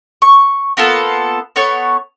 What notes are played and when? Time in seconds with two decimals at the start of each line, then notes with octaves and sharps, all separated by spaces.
0.22 C#6
0.77 A#3 B3 F4 A4
1.56 B3 A4 C#5 C#6